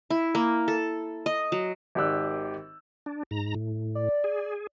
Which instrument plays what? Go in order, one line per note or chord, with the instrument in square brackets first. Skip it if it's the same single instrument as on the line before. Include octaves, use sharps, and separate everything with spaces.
[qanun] E4
A#3
A4
D#5
F#3
[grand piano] G#1 D#3 G4 D5 E6 F#6
[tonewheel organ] D4
G#2 A#5
A2
[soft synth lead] D5
[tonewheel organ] G#4